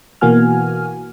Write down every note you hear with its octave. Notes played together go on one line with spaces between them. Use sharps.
B2 E3 A#3 F#4 G#5 F6